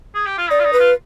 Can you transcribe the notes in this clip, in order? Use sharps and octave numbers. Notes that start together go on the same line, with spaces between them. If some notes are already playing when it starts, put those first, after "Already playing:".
G#4
G4
F4
D#4 D5
F4
D#4
B4
F4